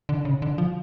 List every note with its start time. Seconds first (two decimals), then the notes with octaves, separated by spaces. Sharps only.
0.09 D3
0.25 C#3
0.42 D3
0.58 F3